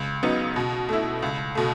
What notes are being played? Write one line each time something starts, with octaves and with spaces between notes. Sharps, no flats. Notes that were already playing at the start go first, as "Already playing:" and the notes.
Already playing: C#2
C#3 F#3 B3 D#4
B2
A3 E4
C#2
B2 A3